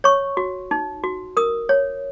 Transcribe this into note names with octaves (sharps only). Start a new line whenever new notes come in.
C#5 C#6
F#4
D#4
F#4
A#4 D#6
C#5